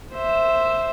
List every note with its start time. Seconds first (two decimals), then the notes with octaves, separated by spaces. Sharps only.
0.12 C5 E5